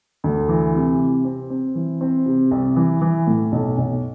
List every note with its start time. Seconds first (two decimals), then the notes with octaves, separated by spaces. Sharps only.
0.24 D2
0.49 E3
0.74 C3
1.00 C3
1.25 C4
1.50 C4
1.75 E3
2.01 C4
2.26 C3
2.51 C2
2.76 E3
3.02 E3
3.27 A2
3.52 B1
3.78 B1